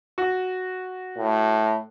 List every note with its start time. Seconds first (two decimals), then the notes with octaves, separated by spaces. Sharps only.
0.18 F#4
1.17 A2